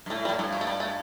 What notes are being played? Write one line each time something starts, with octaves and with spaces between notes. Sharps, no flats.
G2
A2 A3
G3
A2
G2 E3
F3
A3
G3
A3